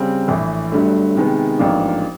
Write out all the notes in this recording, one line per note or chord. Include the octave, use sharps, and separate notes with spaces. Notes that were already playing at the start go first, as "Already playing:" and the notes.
Already playing: C#3 G3 C4
A#1 A2 E3
G1 G2 D3 F#3 A3
C3 D#3 G#3 B3
A1 G#2 F3 A#3 D4